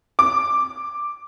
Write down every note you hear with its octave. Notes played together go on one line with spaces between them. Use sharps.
D6